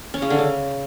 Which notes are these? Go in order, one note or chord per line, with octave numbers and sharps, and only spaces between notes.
C#4
C#3
D3
C#3